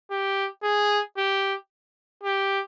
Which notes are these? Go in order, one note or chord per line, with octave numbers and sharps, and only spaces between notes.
G4
G#4
G4
G4